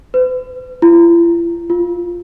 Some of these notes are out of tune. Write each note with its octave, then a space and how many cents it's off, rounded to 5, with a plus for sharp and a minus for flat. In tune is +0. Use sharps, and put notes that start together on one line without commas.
B4 +45
E4 +45
F4 +0